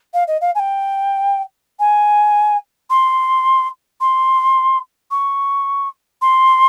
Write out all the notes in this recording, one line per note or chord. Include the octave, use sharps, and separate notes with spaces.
F5
D#5
F5
G#5
G5
G#5
C6
C6
C#6
C6